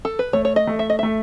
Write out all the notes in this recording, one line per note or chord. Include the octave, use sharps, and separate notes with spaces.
A4
B4
A3 C#5
C#5
D#5
A3
E5
D#5
A3 E5